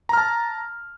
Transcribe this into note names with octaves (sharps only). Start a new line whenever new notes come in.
A5 A#5 F6